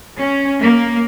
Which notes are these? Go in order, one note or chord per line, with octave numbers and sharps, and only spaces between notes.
C#4
A#3